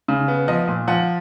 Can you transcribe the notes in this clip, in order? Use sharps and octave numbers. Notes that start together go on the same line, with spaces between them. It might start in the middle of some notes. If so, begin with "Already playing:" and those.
C#3
B3
F3 D#5
A#2
F3 F#5